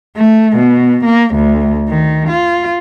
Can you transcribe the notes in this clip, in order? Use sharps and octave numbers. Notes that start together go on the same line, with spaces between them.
A3
B2
A#3
D2
D#3
F4